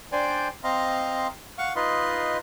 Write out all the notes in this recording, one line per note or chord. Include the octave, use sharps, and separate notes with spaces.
D4 C5 D5 G5 G#5 D6
C4 D#5 F5 A#5 C6
F5 F#5 C#6
D#4 F4 B4 D#5 C6